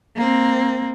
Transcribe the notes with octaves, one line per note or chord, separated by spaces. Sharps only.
A#3 C4